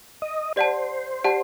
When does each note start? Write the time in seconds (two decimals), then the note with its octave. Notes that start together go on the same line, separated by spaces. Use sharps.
0.22 D#5
0.56 G4 C5 D5 F#5 A5
1.24 G4 D5 F#5 A5